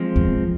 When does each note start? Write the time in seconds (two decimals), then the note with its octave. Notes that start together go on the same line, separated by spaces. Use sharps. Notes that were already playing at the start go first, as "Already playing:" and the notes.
Already playing: F3 G#3 C4
0.16 E2